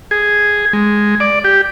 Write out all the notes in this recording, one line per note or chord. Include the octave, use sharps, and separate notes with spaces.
G#4
G#3
D5
G4